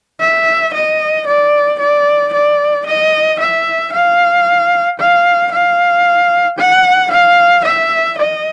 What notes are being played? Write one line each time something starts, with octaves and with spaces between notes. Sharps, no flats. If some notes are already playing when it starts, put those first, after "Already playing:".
E5
D#5
D5
D5
D5
D#5
E5
F5
F5
F5
F#5
F5
E5
D#5